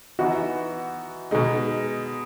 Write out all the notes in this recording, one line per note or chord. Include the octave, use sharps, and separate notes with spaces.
E3 B3 D#4 F#4
B2 G#3 D#4